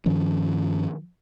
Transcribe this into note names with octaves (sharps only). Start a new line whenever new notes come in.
G2 D#3 F3 C#4